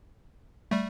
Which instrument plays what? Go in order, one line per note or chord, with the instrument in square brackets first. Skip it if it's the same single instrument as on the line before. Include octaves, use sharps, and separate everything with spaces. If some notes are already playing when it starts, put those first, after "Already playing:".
[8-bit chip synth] G3 A3